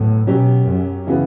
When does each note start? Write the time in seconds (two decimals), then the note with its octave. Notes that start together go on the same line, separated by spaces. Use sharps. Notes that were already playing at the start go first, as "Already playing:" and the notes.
Already playing: A2 F#3 B3 F#4
0.27 B2 F#3 C#4 G4
0.68 F#2
1.07 C#3 E3 B3 F#4